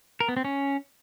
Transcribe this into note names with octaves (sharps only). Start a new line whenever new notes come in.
A#4
B3
C4
C#4